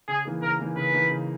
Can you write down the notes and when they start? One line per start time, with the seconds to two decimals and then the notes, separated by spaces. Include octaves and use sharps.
0.08 C#3 G#4
0.25 E3 A#3 D#4 G#4
0.42 C#3 A#4
0.60 E3 A#3 D#4 G#4
0.76 C#3 B4
0.94 E3 A#3 D#4 G#4
1.11 C#3